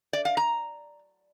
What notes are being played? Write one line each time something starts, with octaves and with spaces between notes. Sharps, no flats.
D5
F5
A#5